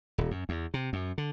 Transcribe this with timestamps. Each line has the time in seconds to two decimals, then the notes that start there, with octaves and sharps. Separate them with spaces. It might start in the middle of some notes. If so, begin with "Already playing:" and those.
0.18 D#1
0.31 F#2
0.49 E2
0.74 C3
0.93 F#2
1.18 D3